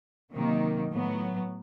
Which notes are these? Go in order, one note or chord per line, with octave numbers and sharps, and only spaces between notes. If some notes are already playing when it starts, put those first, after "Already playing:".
C3 D#3 F#3 A#3
A2 F#3 B3